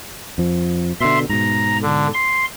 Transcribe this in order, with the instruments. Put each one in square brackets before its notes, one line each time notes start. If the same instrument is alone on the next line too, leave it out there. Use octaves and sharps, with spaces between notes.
[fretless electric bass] F2 F3
[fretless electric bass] B2 D3 [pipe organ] E5 C6
[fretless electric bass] G#2 B2 [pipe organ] A#5
[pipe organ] D3
C6